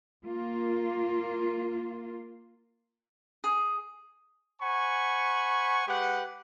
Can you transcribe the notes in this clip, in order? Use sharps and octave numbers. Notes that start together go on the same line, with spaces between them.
A#3 F4
G#4
C5 F#5 G#5 B5 C#6
G#3 G4 B4 F#5